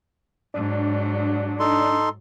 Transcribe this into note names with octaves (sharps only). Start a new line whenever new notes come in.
G#2 F#3 D4
D#4 A4 C6